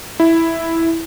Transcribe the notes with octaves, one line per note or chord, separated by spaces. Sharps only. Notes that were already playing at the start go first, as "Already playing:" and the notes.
E4